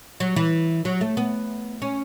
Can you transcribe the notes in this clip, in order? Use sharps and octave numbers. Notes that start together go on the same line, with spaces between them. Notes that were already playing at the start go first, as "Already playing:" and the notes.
F#3
E3
F#3
A3
B3
C#4